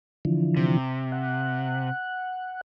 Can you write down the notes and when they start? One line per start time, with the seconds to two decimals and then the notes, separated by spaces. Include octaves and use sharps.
0.25 D3 E3 F3
0.57 C3
1.12 F#5